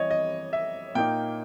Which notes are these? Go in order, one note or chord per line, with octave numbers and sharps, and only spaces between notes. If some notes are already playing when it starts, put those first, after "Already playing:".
Already playing: E3 G3 C#5 D#5
D#5
E5
A#2 A#3 D#4 G5